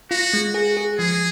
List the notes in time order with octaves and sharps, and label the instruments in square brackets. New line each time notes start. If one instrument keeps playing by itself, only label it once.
[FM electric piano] F4 [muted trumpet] F#4
[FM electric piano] G#3
[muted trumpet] F#4 [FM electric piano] G#4
[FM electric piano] G#4
[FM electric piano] F3 [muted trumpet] G#4